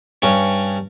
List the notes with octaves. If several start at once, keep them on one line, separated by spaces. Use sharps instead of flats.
G2 C#4